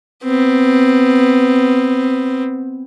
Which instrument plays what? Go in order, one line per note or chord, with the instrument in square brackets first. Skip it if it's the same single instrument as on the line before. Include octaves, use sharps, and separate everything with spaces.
[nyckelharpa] B3 C4